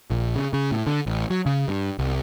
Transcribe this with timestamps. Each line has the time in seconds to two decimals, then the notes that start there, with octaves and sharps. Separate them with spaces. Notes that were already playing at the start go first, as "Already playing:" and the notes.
0.10 A#1
0.36 C#3
0.53 C#3
0.72 A2
0.87 D3
1.06 A1
1.30 F#3
1.46 C#3
1.68 G2
1.99 C2